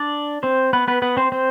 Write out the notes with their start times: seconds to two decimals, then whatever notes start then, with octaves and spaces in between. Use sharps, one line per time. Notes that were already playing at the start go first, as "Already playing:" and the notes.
Already playing: D4 D5
0.43 C4 C5
0.73 B3 B4
0.88 B3 B4
1.02 B3 B4
1.17 C4 C5
1.32 C4 C5